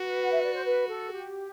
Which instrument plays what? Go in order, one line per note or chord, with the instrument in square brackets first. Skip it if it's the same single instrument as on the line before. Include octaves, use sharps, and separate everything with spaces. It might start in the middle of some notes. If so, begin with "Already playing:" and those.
Already playing: [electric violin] F#4 [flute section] B4
[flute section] F#5
E5
D5
C5
B4
A4
G4